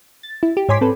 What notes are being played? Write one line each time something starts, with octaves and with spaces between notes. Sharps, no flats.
A6
E4
G4
G#2 C#5 G#5 C6 D6 B6
C4 A4 B4